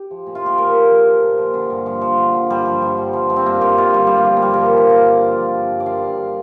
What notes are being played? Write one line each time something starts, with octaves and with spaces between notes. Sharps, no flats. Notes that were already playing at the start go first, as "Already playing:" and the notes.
Already playing: G4
F3
A#2
F4
F3 G4
A#2 A#4
F3
F3
F3
A#2
F3
D3
G2
F3
F3
D3
D3
G2 G3
F3
G2
F3
F3
G2
C4
D3 A#3
G2 G4
G2 F4
D3 G3
D3 G3
A#3
F3
A#3
G2 G3
F3 A#4
C5
F3 F5
G2 D5
G2
F3
F3
G2
G2
D5
F3 F5
G2